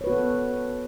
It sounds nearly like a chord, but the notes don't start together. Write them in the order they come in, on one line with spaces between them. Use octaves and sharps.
C#5 B4 F#4 B3 A4